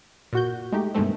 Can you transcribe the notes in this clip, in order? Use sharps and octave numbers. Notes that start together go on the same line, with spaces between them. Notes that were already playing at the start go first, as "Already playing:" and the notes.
A#2 F#4 G6
G#3 A3 D#4 G4
G2 B2 D#3 G#3 A3 C4